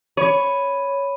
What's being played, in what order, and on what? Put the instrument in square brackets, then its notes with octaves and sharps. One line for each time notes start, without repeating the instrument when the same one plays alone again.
[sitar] C#5 [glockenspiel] B5 D#7